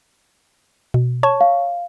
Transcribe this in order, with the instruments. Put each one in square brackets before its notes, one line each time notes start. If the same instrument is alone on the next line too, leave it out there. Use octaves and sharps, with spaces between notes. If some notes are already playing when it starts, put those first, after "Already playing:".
[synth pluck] B2
C#5 A5 C#6
[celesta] F5